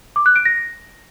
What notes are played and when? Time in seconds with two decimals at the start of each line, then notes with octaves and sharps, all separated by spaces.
0.16 D6
0.26 F#6
0.36 D7
0.45 A#6